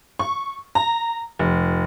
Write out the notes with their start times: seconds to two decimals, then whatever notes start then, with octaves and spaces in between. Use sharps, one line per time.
0.19 C#6
0.75 A#5
1.39 F1